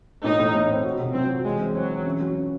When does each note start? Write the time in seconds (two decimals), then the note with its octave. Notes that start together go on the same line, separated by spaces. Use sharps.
0.24 A2 D#4
0.39 A2
0.54 A2
0.70 C4
0.84 F#4
0.99 C3
1.14 F#3 C4
1.30 F#4
1.44 E3 G#3
1.60 C4
1.74 F#3 C4
1.90 E3
2.05 C#3
2.21 F#3
2.35 C#3